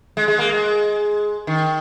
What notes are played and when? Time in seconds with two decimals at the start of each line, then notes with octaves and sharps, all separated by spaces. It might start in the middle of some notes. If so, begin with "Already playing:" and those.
0.17 G#3
0.28 G#3
0.39 A#3
0.49 G#3
1.47 D#3